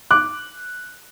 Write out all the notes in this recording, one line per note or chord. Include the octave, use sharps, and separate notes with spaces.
D6 F#6